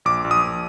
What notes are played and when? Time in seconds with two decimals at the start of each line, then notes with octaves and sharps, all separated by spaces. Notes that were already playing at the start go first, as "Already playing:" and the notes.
0.05 A#1 D6
0.24 A#1
0.31 D#6
0.43 A#1